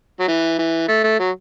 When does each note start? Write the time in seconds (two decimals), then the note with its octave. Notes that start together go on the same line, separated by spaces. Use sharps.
0.20 F#3
0.28 E3
0.59 E3
0.88 A3
1.04 A3
1.19 F#3